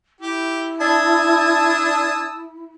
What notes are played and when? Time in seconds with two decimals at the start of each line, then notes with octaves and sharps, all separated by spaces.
0.20 E4 G4
0.80 D4 A5 D#6 E6 G#6